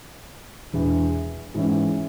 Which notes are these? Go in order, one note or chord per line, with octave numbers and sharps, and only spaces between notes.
E1 E2 E3
G#2 E3 C#4 E4